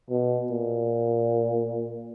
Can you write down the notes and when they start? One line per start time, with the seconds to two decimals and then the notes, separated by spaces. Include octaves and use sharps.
0.10 B2
0.51 A#2